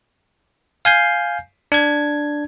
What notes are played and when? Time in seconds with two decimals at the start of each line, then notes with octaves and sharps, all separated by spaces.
0.85 F5 G#5 G6 C7
1.72 D4 G#6